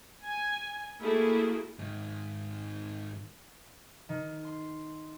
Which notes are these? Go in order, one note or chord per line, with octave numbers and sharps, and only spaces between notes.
G#5
A3 A#3 E4 F#4 G#4
G#2 D#3
D#3
C6